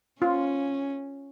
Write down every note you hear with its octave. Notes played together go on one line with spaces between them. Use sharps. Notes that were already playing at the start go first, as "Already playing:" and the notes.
C#4 F4